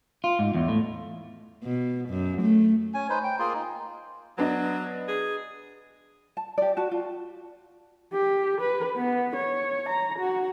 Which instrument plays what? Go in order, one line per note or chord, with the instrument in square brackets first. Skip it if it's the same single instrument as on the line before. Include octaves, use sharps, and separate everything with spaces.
[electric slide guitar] F4
G#2
E2
A2
[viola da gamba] B2
F#2
A3
[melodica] C#4 G#5
D#4 B4 C5
G5
A#3 F4 G#4 C6
D#4
[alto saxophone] F#3 [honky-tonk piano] B3 D4 D#5
[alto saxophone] G#4
[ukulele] A5
G4 D5
F#4 A5
F4
[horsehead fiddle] G4
B4
B3
C#5
A#5
F#4